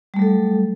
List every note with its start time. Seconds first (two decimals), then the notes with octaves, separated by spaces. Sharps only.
0.14 G3
0.16 A3
0.19 F#3
0.22 A4